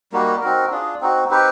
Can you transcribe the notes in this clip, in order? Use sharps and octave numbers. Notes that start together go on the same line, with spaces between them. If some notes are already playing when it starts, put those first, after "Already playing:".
G3 A#3 D#4 F#4
C4 D#4 F#4 A#4
D4 F4 G#4
C4 D#4 F#4
C4 D#4 G4 B4